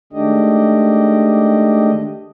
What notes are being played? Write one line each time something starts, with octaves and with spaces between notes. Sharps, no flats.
D#3 G#3 A3 D4 G4 D#5